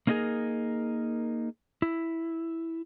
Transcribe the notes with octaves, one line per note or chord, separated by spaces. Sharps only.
A#3 C#4 D#4 E4 G#4 A#4
E4